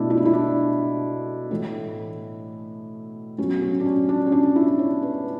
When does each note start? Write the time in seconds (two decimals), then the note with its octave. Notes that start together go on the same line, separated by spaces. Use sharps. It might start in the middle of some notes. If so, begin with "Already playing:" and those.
Already playing: B2 A3 D4 E4
0.10 E4
0.17 D4
0.25 E4
0.33 D4
1.51 A2 E3 A3 E4
3.38 A2 F#3 B3 C#4
3.62 C#4
3.80 D4
3.86 C#4
4.09 D4
4.26 C#4
4.32 D4
4.56 E4
4.79 C#5
5.02 B4